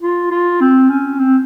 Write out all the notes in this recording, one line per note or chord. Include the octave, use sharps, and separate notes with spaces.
F4
F4
C4
C#4
C4